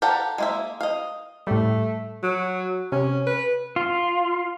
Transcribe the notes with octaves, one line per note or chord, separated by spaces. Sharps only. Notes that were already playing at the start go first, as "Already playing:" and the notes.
G4 A4 A#4 F5 F#5
G#3 A#3 E5
D#5 F5
A2 G3 A3
F#3
C3 C#4
B4
F4